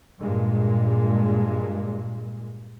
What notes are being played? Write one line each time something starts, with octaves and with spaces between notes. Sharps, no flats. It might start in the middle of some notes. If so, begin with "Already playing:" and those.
G2 A#2 G#3